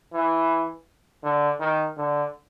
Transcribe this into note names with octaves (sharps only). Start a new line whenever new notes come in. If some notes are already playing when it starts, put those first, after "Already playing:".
E3
D3
D#3
D3